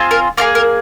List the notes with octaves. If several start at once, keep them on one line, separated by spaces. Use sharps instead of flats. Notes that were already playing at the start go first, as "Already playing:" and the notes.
Already playing: C4 F4 G#4
A#4
A#3 F4 G#4 A#4
A#4